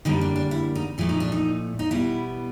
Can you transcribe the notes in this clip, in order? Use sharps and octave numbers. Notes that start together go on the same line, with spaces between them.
F#2 D3 G3 A#3 D#4
D4
D4
E4
D#4
A#2 F3 A3 E4
D#4
D4
D#4
D#4
B2 G3 B3 E4